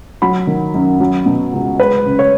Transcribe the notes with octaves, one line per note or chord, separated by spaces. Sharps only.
F#3 B5
D#3
F#2
F#3
B2
C#2
G#3 B4
C#3
C#5